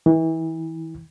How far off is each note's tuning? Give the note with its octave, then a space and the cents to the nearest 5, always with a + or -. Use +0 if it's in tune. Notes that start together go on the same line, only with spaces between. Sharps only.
E3 -30